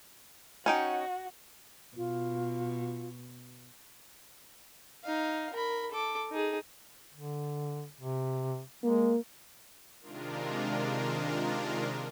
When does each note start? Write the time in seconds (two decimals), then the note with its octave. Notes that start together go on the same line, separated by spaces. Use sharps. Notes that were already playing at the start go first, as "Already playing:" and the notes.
0.66 C#4 D#4 F#4 G5
1.97 B2 F4
5.03 D#4 F5
5.53 A#4 B5
5.91 A4 D6
6.31 D#4 G#4
7.14 D3
8.01 C3
8.84 G#3 A#3
10.01 C3 D#3 G#3 D4 F4 A#4